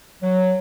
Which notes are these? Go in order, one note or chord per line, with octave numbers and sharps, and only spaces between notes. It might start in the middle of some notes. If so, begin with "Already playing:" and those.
F#3